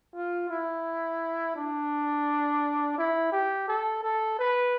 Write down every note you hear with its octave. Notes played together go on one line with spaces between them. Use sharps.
F4
E4
D4
E4
G4
A4
A4
B4